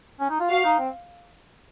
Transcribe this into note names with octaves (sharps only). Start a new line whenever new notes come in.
C#4
D#4
F4
F#4 F5
D#4
C4